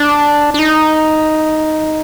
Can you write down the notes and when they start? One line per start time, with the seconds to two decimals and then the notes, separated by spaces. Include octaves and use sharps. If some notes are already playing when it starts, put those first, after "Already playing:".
Already playing: D4
0.54 D4
0.59 D#4